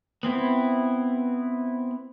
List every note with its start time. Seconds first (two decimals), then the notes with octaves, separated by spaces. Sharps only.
0.23 B3 C4 E4